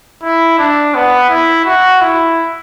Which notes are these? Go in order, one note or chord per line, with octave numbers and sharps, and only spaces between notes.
E4
D4
B3
E4
F#4
E4